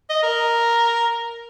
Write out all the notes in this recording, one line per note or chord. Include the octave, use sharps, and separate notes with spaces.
D#5
A#4